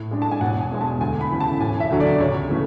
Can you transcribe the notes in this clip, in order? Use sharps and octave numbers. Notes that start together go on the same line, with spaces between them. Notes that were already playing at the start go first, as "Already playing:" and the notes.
Already playing: A2
G#3 D4
A5
G#5
E1 F#5
G#5
E2 B2 G#3
A5
D2 G#5
B5
C#3 E3
A5
E1 G#5
E5
D2 D3 F#3
D5
C#2 C#5
C#3 E3 A3